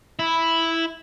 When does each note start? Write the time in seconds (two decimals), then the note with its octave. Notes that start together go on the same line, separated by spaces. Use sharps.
0.19 E4